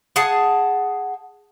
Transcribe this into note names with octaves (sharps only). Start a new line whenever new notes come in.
G#4 F#5 A5